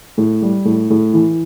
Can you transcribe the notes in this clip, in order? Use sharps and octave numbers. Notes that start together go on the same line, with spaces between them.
A2
G3
A2
A2
E3